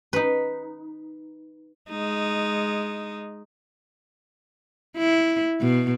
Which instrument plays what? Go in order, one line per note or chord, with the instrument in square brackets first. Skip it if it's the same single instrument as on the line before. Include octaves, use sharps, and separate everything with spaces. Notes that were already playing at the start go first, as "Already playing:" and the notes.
[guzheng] D#4 B4
[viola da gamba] G#3 D#4
E4
B2